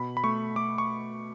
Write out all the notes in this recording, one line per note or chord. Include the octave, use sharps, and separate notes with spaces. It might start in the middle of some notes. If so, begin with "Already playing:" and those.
Already playing: B2 B5
B5
A3 C#6
A3 D6
C#6